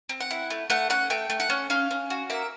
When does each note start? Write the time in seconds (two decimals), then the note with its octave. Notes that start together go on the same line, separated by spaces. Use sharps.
0.09 C4
0.20 F#5
0.31 E4
0.50 A3
0.70 A3 F#5
0.90 C#4 F#5
1.10 A3 G5
1.30 A3
1.40 F#5
1.50 C#4
1.70 C#4 F5
1.91 C#4
2.10 F#4
2.30 A#3 E5